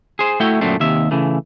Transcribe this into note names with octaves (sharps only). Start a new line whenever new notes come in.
G#4 C5
A3 E4 F#4 G5
F#2 A#2 D3 A3 C4
D#2 C3 E5
C#3 E3 A3